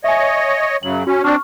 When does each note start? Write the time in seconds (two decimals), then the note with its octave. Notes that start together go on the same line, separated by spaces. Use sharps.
0.04 C#5 D#5 E5 G#5
0.83 F#2 C#3 F#3 F#7
1.07 C#4 F#4
1.24 C4 D4 C#6 F6